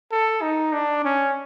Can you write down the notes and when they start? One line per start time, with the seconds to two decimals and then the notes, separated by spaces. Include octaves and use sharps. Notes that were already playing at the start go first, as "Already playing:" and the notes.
0.12 A4
0.42 D#4
0.73 D4
1.05 C#4